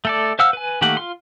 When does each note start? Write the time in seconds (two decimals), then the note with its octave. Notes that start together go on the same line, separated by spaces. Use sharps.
0.05 A3 A4 D5
0.39 C5 F5 F#5 E6 F6
0.53 B4 G#5
0.81 D#3 A3 A#3 G4 F#5
0.97 F4 C6